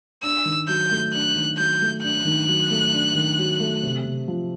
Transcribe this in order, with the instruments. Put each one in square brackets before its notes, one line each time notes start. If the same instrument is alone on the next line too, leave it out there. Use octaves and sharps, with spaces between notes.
[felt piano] D4 [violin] E6
[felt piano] D#3
[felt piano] F#3 [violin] G6
[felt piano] A3
[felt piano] D4 [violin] F#6
[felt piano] D#3
[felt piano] F#3 [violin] G6
[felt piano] A3
[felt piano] D4 [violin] F#6
[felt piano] D#3
F#3
A3
D4
D#3
F#3
A3
C3
C3
F3